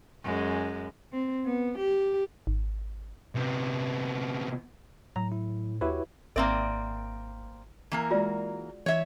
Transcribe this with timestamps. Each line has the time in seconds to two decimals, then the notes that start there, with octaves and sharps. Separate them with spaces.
0.24 F#2 G#3
1.13 C4
1.46 B3
1.79 G4
2.47 G#1
3.35 C3 B3
5.16 A2 F#3 A#5
5.32 E4
5.81 D#2 E4 F#4 G4 B4 C#5
6.36 G#1 A#3 C4 A#4 D5 E5 E6
7.92 E3 A#3 A#4
8.11 G#3 F4 F#4 D5
8.86 E3 C#5 E5